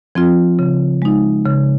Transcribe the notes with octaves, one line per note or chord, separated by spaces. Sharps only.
F3 C4 F4
C#3
G#3 D#4
C#3